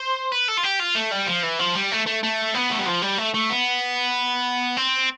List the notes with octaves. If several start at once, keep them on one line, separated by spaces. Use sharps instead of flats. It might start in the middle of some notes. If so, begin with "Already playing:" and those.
Already playing: C5
B4
A4
F4
G4
F4
A3
G3
F3
E3
F3
G3
A3
A3
A3
B3
A3
G3
F3
G3
A3
A3
B3
C4